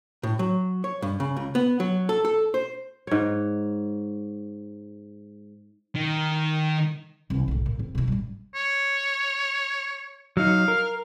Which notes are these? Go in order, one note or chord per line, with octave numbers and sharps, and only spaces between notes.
A2
F#3
C#5
G2
C#3
C#2
B3
F#3
A4
A4
C5
G#2 C#5
D#3
C2 E3
B1 G#2
A#2
F2
B2 E3
A1 G3
C#5
F#3 D#4 F5
A#4